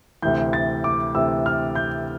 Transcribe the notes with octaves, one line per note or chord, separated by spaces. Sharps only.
D2 C3 E3 G6
A6
D6
D2 C3 E3 E6
F6
G6